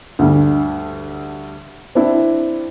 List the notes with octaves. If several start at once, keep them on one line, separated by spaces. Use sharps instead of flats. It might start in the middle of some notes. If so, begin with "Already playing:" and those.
D2 G2
C4 D4 E4